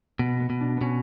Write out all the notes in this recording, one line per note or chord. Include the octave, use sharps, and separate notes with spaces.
B2 B3
B3
B2
D4
B2 B3 C#4